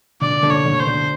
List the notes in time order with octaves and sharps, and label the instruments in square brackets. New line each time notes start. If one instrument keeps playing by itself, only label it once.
[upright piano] D3 [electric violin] D5
[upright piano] D3
[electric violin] C#5
[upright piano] D3
[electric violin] C5
[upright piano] D3